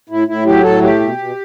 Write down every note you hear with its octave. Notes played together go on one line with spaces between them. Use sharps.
A2 E4
A2 E4
F#3 G4
A2 A4
A3 G4
B2
B2